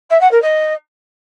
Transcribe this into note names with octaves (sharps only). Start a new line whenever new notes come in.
E5
F#5
A#4
D#5